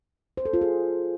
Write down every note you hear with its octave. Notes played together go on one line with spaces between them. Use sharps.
C5
A4
F4
G#4